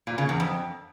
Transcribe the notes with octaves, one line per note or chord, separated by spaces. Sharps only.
A#2
C#3
E2
F2